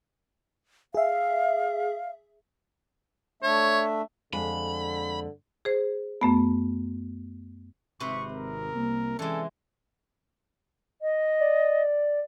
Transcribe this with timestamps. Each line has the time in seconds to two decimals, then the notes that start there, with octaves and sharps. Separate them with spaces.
0.94 G#4 E5 F5
3.43 A3 D4 C#5 E5
4.33 F2 D3 G#3 F5 B5
5.65 G#4 C5
6.21 F#2 A3 B3
8.00 G#1 C3 B4 B5 C#6
8.32 A#4
8.74 C2 A#3
9.19 E3 G#3 C#4 A4 D5
11.01 D#5
11.40 D5